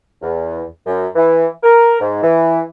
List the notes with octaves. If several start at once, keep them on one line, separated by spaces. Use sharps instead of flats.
E2
F#2
E3
A#4
G#2
E3